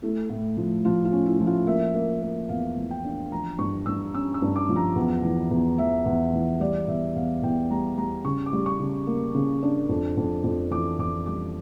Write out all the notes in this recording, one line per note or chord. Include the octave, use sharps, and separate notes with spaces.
A3 E4
A2
F3
F3 F4
F4
C#4
E4
F3
F4
A#3 E5
A#3
A#3
E2 F5
E3
G5
D4
F3 A#5
G2 C#6
G2 E6
C#4 E6
E6
G2
D6
F3
A#5
E2
E3
E2
E3 E5
E2
E3
G3 D5
E2 E5
E2 F5
E2 G5
G3 A#5
G3 A#5
C#3 C#6
D6
G3
C#6
C#3
A#3
C#3
D4
F2
F2
F2
E3 D6
F2 D6
G3 D6